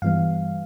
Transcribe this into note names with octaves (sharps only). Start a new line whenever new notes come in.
G2 E3 G3 B3 F5